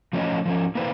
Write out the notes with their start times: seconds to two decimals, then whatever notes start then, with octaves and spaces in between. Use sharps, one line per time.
0.13 F3 A3 C#4 F4 D#5
0.45 F3 A#3 C#4
0.75 A#3 C4 B4 C5 D5 F5